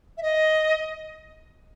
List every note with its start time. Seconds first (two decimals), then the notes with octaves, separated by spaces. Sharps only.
0.18 E5
0.22 D#5